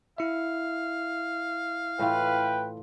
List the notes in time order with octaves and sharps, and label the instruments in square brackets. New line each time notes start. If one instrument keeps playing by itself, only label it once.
[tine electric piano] E4 E5 [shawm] F5
[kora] A2 E3 F4 [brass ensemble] B4 G5